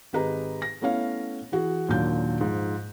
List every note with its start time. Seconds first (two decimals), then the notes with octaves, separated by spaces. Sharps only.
0.13 G#1 G4 G#4 B4 D#5 A#5
0.62 A#6
0.81 A3 B3 C#4 E4 C#5 F5
1.52 E3 E4 F#4 G#4
1.89 D#2 A#2 F#3 D4 G6
2.41 G#2 F3